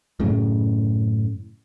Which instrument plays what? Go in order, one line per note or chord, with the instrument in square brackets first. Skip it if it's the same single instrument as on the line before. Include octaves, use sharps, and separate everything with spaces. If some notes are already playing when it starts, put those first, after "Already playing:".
[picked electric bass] F#2 A2 C#3